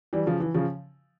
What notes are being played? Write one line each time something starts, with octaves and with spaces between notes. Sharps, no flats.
E3 G3
C#3 F3
E3
C#3 F3